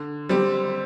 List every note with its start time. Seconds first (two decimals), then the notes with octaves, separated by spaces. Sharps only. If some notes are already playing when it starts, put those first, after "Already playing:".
Already playing: D3
0.29 G3 C4 G4